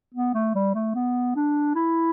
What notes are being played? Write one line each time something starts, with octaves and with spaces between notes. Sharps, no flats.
B3
A3
G3
A3
B3
D4
E4